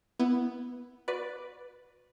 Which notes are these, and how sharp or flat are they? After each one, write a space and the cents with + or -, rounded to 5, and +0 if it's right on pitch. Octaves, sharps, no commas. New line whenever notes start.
B3 +0 E4 +5
F#4 -25 B4 +0 D5 +0